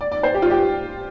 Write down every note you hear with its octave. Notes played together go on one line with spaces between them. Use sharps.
D5
D5
C5
G4
F4
G4